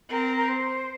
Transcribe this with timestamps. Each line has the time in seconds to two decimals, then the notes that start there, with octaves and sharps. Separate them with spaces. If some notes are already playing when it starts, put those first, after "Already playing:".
0.10 C4 A#4
0.37 A#4
0.48 C5